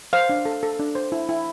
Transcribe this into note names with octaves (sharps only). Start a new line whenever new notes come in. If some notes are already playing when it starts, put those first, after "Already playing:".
C5 F5
D4
A4
A4
D4
C5
E4
E4